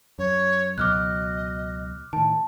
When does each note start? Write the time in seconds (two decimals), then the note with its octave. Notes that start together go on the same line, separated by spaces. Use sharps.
0.19 F#2 C#5
0.78 C#2 B2 F#3 D#5 D6 F6 F#6
2.13 A2 D#3 A5